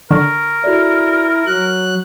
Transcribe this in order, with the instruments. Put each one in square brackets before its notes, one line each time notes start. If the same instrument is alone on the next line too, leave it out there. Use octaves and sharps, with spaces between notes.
[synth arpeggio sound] D3 [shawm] A#4 [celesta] C#6
[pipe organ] E4 [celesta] F#4 A4 D5
[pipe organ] F#3 F#6 [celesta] F#4